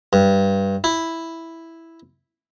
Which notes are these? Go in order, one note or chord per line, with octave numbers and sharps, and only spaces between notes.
G2
E4